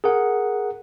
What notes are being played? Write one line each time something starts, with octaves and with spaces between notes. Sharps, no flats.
G#4 A#4 F#5